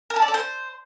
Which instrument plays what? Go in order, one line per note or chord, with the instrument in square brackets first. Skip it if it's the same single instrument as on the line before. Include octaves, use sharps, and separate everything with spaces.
[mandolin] A#4
A4
D5
A4
C5